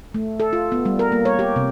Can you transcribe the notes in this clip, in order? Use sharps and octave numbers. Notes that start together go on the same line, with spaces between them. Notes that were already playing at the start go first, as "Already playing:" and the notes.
A3
A4
F4
B3
G3
A#4
A#3
C#5
G4
C3